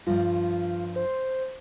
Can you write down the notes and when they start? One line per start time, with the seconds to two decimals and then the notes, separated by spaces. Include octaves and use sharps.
0.06 G2 F3 F4
0.96 C5